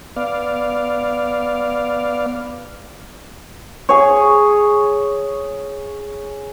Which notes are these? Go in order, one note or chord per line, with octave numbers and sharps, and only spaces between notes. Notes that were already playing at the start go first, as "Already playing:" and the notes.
B3 D5 F5
G#4 C#5